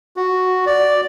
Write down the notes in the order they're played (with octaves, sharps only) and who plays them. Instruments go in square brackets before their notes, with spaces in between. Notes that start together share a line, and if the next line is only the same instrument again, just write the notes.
[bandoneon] F#4
D5